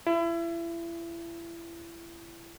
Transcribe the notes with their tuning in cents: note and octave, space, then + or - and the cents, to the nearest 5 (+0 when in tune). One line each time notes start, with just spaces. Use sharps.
E4 +35